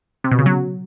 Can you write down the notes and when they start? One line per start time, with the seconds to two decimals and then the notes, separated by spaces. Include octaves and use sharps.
0.24 C3
0.31 B2
0.39 C#3
0.46 F#3